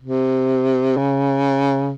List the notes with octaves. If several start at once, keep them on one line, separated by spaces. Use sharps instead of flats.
C3
C#3